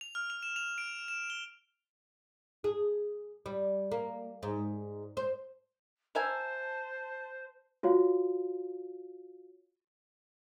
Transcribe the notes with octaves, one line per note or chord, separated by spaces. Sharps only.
F7
F6
F7
E7
F7
D7
E7
G7
G#4
G3
A#3
G#2
C5
A#4 C5 E5 G#5 A5
F4 F#4 C#5 F5